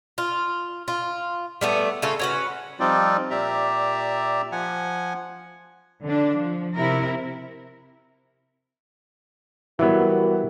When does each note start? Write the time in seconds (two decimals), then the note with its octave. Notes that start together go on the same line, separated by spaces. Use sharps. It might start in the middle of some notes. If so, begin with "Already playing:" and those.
0.18 F4
0.88 F4
1.61 G3 A3 B3
2.02 C#3 A3 F4 A4
2.19 C#4 F#4 B4
2.80 F3 G3 C4 D#4 F4 D5
3.30 A#2 G4 D5 E5 A#5
4.52 F3 F#5 G#5
6.03 D3 D4
6.35 F3
6.75 C3 E4 A#4
9.79 E3 F#3 G3 B3 E4 F#4 G4 A#4